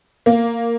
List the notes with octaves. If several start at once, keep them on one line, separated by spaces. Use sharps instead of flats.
A#3